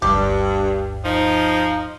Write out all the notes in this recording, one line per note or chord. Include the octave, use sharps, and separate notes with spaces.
D1 G1 G2 G3 G4
F3 D#4